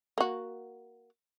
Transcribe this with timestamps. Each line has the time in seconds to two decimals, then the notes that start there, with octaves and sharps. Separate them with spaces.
0.18 A#3 F#4